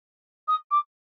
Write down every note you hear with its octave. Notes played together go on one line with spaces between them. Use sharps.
D#6
D6